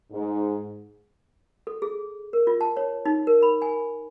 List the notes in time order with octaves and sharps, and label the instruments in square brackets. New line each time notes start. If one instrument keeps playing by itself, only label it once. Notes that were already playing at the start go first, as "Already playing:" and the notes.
[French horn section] G#2
[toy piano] A4
G#4
A#4
F4
A5
C#5
D#4
A#4
B5
G#5